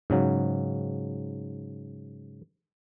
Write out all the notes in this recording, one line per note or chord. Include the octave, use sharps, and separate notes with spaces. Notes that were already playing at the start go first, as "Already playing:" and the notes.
G#2 C#3 F#3